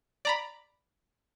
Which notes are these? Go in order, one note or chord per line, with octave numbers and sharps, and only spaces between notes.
D5 A#5 B5